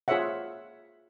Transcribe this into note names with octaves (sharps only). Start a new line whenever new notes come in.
F4 G#4 C5 C#5 E5 F#5